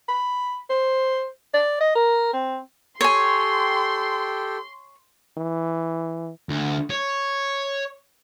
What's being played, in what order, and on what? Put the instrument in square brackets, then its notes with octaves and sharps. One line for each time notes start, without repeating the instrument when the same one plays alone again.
[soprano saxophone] B5
C5
D5
D#5
A#4
C4
[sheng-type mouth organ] G4 A4 G5 [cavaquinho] C#5 G#5 [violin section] C6
[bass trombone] E3
[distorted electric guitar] D2
C#5